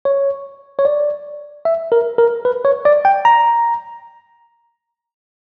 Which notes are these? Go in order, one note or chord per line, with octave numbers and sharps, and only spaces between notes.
C#5
C#5
D5
E5
A#4
A#4
B4
C#5
D5
G5
A#5